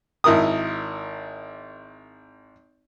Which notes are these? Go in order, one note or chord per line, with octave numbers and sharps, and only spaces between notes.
G#1 E4 A#4 D#6